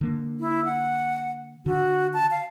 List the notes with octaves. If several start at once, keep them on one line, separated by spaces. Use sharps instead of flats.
D3 A#3
E4
F#5
D3 F#4
A5
F5